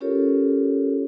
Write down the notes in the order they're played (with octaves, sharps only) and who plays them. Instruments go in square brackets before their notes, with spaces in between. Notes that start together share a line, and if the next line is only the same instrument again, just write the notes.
[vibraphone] C#4 F4 G4 A4 A#4 C#5